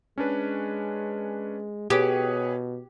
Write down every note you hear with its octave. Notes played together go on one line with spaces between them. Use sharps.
G#3 C#4 D4 B4
B2 G4 G#4 B4 C#5